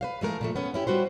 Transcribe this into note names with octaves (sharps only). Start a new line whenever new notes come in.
B4 C5 F5
E3 G#3 A3 A#4
A#2 F3 A3
B3 C#4
C#4 E4 G4
G3 F#4 B4 C5